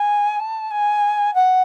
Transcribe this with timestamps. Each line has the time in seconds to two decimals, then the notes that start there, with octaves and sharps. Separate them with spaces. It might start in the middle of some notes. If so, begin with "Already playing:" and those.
Already playing: G#5
0.39 A5
0.71 G#5
1.34 F#5